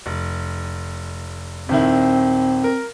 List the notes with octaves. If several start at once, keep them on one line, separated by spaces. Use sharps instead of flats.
F1
D#1 D#3 C4 E4
A#4